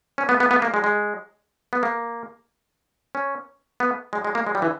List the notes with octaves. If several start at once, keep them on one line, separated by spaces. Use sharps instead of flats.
C#4
B3
B3
B3
A#3
G#3
G#3
B3
A#3
C#4
B3
G#3
G#3
A#3
G#3
G3
E3